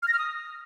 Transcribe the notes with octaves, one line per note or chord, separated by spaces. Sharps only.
F6
A#6
F6
D#6